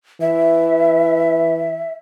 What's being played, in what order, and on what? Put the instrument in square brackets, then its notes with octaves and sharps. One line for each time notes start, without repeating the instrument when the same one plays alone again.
[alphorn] E3 [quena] E5